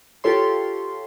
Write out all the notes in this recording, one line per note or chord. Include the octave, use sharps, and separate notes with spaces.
F4 G4 A4 C#5 C6